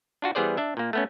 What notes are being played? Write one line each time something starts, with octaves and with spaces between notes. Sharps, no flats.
D4 F4 F#4
E3 G3 B3 G#4 C5 D5
D4 E5
A#2 A#3
A3 B3 C#4